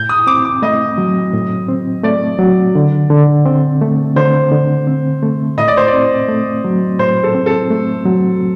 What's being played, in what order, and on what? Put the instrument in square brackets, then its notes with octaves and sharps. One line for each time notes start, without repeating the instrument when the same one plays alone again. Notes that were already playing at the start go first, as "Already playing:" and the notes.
Already playing: [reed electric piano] A2 [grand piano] G6
[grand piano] D#6
[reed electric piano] C4 [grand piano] D6
[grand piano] D6
[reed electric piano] A3 [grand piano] D#5
[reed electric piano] F#3
A2
C4
[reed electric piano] A3 [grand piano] D5
[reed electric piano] F#3
D3
D3
C4
A3
[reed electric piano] D3 [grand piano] C5
[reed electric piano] D3
C4
A3
[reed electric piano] A2 [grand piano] D#5
[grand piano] D5
C5
D5
[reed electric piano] C4
A3
F#3
[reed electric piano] A2 [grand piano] C5
[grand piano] A4
[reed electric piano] C4
[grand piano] A4
[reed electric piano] A3
F#3